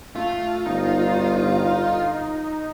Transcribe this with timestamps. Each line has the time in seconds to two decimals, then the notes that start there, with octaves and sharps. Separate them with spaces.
0.15 A3 F4
0.66 G1 D#4